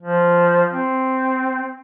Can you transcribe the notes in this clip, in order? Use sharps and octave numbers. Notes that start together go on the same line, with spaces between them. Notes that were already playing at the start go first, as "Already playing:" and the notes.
F3
C4